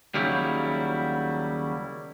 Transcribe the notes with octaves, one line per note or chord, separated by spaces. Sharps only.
D#2 C#3 F#3 G3 E4